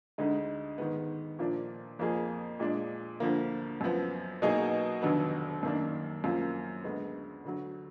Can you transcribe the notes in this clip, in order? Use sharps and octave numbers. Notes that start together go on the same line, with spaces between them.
D2 D3 G#3 D#4
G#2 D#3 G#3 B3
A#2 F3 A#3 D4
F2 F3 A#3 F4 G#4
A#2 G#3 D4
D2 D3 F3 A#3
F#2 F3 B3
B2 F#3 A#3 D#4 G#4
F1 D#2 D3 F#3 B3
F#2 D#3 A#3 D4
F#2 F3 A#3 F4
D2 D3 G#3 B3
D2 D3 F#3